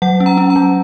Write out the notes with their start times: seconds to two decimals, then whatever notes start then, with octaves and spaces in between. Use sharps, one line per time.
0.02 F#3 F#5
0.20 C#4
0.26 A#5
0.37 C#4
0.50 A#5
0.56 F#3